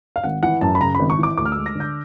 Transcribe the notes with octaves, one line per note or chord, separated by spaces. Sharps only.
F5
G#1 F#5
E3 F#5
F#2 A5
B5
C#3 A#5
B5
G#1
C#6
E3 D6
D2 D6
F6
G#3 E6
A#6
D3
G6